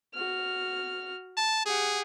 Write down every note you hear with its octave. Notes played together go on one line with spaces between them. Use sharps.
F#4 F6
A5
G4 G#4 F#5